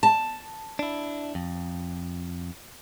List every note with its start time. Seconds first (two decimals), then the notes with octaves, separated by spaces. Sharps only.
0.03 A5
0.79 D4 E4
1.35 F2